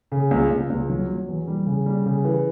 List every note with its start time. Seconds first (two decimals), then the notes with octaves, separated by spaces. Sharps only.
0.12 C#3
0.31 C#2
0.51 C#2
0.70 C#2
0.90 F#3
1.09 F#3
1.28 E2
1.48 G3
1.66 C#3
1.86 G3
2.06 C#3
2.24 E3